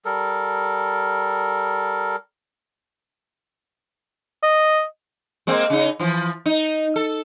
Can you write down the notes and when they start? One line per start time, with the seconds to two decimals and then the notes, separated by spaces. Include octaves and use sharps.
0.05 G3 A4 A#4
4.43 D#5
5.47 G#3 A#3 C4
5.70 C#3 D#4
6.00 E3 F3
6.46 D#4
6.96 A4